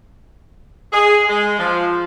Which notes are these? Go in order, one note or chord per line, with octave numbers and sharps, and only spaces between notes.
G#4
G#3
F3